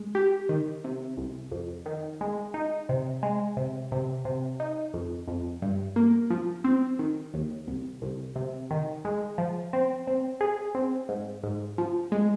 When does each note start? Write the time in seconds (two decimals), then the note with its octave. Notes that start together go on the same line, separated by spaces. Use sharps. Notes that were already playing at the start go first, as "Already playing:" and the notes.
Already playing: G#3
0.15 G4
0.49 D#3
0.84 C3
1.17 C2
1.52 F2
1.86 D#3
2.21 G#3
2.54 D#4
2.89 C3
3.23 G#3
3.57 C3
3.92 C3
4.25 C3
4.60 D#4
4.94 F2
5.28 F2
5.62 G2
5.96 A#3
6.30 F3
6.64 C4
6.99 D#3
7.34 D#2
7.67 C2
8.02 C2
8.36 C3
8.71 D#3
9.05 G#3
9.38 F3
9.73 C4
10.07 C4
10.41 G#4
10.75 C4
11.09 G#2
11.43 G#2
11.78 F3
12.12 G#3